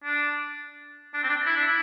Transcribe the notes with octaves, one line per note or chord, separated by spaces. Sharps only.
D4
D4
C4
D4
E4
D4
E4